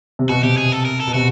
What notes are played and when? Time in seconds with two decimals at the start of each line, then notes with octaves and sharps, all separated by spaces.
0.19 C3
0.29 B2 F#4
0.43 C3 G4
0.58 G#4
0.72 A4
0.85 A#4
1.00 A4
1.07 B2
1.14 C3 F#4